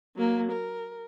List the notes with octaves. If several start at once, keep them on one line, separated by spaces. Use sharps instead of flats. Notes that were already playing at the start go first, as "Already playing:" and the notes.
F#3 A#3
A#4